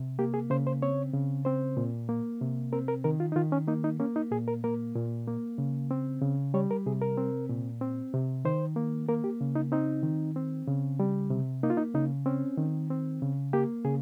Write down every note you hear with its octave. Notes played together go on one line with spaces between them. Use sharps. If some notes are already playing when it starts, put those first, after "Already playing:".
Already playing: C3
A#3 G4
G#4
C#3 C5
C5
C4 C#5
C#3
C4 C5
A#2
A#3
C3
C4 A#4
A#4
D#3 A#4
F4
D#4
D#3 F4
C#4
A#3 D#4
D#4
A#3 C#4
D#4
A#2 G#4
A#4
A#3 A#4
A#2
A#3
C#3
C4
C#3
G3 C#5
A#4
C3 G#4
A#4
C4
A#2
C4
C3
D#3 C5
A#3
A#3 A#4
G4
C#3
D#4
C4 D#4
D#3
C4
C#3
G3
C3
A#3 D#4
F4
D#4
C#3 D#4
C4 C#4
D#3
C4
C#3
A#3 G4
C#3 G#4